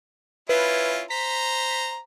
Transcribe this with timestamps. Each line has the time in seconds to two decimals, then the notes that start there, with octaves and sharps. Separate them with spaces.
0.49 C#4 E4 F4 B4
1.10 C5 A#5 B6